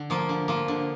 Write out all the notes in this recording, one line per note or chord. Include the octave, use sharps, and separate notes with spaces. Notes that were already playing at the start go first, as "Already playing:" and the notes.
Already playing: D3
F3 A#3
D3
F3 A#3
D3